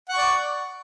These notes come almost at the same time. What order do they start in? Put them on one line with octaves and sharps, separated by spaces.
F#5 C#6 D5